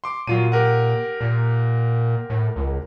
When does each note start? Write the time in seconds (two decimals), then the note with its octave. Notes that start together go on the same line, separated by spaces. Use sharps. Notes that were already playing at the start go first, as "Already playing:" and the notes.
0.04 C6 D6
0.27 A#2 F#3 F4 D#7
0.52 G4 A#4 F#5
1.21 A#2
2.30 A2
2.56 C#2